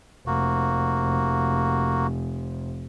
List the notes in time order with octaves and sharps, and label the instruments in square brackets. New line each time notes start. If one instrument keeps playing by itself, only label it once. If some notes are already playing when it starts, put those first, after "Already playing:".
[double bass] F1 [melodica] A#3 F#4